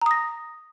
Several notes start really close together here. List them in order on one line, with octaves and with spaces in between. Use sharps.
A#5 D#6 A#6